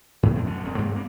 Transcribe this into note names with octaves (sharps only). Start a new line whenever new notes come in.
G#2
A2 F3 C4
F#2 B2 D3
E1 E2 C4
G2 G3 A#3 C4
A#3 B3